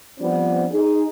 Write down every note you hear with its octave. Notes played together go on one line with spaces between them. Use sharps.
F3 G3 B3 C4 D4
D#4 G#4